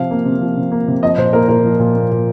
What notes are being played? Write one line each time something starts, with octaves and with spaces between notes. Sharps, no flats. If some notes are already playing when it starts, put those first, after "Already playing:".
Already playing: C3 F3 F5
A#3
C3
F3
C3
A#3
C3
F3 D#5
A#2 C5
A#3 A#4
A#2 A#4
F3
A#2
A#3
A#2